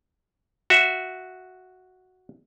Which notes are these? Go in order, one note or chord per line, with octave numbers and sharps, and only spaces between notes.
F#4 E5